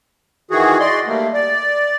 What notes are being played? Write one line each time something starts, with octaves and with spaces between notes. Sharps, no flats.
D#3 E3 F#4 G#4
D5 D#5 C6
G3 A3 A#3
D5